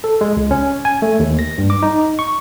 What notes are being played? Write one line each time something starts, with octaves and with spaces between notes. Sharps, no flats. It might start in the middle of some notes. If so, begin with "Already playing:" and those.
A4
G#3
C#2
C#4
G#5
A3
D#2
A#6
G2
D6
D#4
C#6